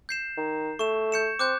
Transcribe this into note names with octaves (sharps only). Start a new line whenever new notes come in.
G6 C7 E7
D#3
A3 C#6 E7
G6 C#7 E7
C4 D6 F#6 G6